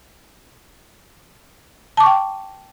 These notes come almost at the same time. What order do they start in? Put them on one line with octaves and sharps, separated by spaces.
A5 D6 C#6 G5